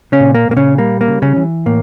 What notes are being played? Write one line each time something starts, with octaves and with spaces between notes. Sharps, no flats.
C#3 C#4
A#2
A#3
A#2 A#3
C#3 C#4
G3 A#3
A#3
C#3
C#3 C#4
E3
A2 A#3